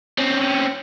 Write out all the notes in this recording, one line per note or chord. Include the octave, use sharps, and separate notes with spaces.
C4 C#4